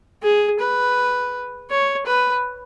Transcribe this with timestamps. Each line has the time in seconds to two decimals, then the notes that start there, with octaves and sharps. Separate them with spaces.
0.23 G#4
0.60 B4
1.70 C#5
2.06 B4